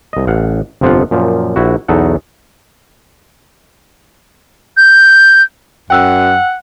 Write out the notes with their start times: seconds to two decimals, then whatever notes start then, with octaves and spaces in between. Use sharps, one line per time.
0.13 C2 D#5
0.27 A1 F5 F#5
0.81 G1 F2 C3 F3 F4 F#5
1.11 F#2 A#2 F3
1.56 A#1 E4 F#4
1.88 B1 E2 D#4 A4 F#5
4.77 G6
5.90 F#2 F#5 G5 E6 F#6